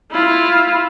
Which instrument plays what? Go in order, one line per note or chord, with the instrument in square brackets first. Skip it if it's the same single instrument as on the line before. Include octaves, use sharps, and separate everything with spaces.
[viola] E4 F4